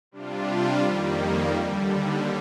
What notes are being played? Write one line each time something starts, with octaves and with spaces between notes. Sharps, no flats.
C3 G3 D4 F4
F2 D#3 G3 A#3
D#2 D3 G3